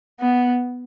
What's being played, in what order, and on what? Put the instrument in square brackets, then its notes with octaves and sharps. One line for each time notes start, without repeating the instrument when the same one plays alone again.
[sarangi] B3